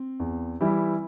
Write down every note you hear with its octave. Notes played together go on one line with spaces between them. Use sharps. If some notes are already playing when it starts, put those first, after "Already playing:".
Already playing: C4
E2
E3 G3 E4